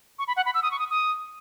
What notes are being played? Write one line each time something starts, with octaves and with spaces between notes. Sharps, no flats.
C#6
B5
F#5
B5
E6
D#6
C#6
D#6
D#6